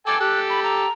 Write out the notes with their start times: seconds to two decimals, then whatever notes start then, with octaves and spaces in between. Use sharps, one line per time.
0.07 A4 G5 G#5 D6
0.20 G4 A4 F#6
0.50 B5
0.64 A#5